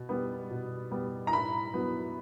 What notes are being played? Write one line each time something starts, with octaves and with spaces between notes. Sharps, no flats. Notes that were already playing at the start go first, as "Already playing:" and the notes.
Already playing: B2
G3 B3
B2
G3 B3
A#5
A2 B5
F#3 B3